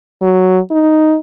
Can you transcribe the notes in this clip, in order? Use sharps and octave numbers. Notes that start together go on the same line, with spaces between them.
F#3
D#4